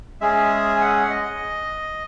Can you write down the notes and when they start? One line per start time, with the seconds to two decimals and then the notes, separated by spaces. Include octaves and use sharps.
0.21 G#3 C#4 G#4 E5
0.76 G#5
0.81 F#5
1.10 D#5